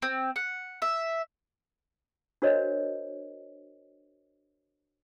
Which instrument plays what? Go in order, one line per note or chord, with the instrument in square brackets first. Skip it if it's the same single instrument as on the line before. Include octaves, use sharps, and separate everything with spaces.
[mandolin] C4
F#5
E5
[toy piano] D4 F#4 A#4 C5 C#5 D#5